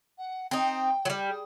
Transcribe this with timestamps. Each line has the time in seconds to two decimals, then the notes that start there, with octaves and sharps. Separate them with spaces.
0.18 F#5
0.51 C4 D#4 G5
1.05 F#3 G3
1.29 G#4